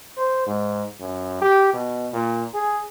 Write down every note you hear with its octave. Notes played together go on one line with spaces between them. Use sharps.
C5
G#2
F#2
G4
B2
A#2
G#4